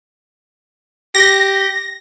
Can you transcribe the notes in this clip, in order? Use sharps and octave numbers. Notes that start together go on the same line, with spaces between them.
G4 A#6